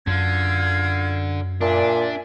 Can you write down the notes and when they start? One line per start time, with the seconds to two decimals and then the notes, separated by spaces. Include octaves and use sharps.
0.07 F#2 D3 F4 G6 G#6
1.61 A#2 D4 D5 E5 G#5